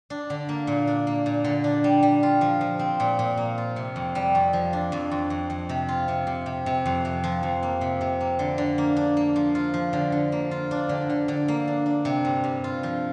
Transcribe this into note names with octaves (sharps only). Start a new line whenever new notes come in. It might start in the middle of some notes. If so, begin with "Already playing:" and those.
D4
D3
A#3
A#2
D4
A#3
A#2
D3
D4
G3
G3
F4
F3
F3
C4
A#2
A#2
A#3
F4
C3
F2
G3
F2
F3
D4
F2
F2
F2
F2
C3
F4
C3
C3
C3
C3
F2
C3
F3
F2
A#3
C3
C3
A#3
D3
D3
A#3
D4
A#3
F3
F4
F3
D3
D3
A#3
F4
D4
D3
D3
D3
A#3
D4
D4
C3
G2
G2
F4
F3